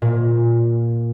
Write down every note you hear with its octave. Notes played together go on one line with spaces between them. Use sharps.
A#2